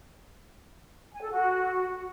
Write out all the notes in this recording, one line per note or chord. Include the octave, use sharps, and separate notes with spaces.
G#5
A4
F#4